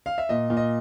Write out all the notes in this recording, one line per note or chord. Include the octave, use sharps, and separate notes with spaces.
F5
E5
A#2 D#5
A#2
D#5